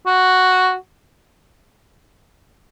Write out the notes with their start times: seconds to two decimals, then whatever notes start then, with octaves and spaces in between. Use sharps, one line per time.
0.06 F#4